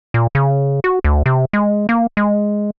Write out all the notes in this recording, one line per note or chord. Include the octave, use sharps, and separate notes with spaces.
A#2
C#3
F#4
D2
C3
G#3
A#3
G#3